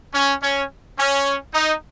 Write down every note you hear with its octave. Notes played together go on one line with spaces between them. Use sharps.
C#4
C#4
C#4
D#4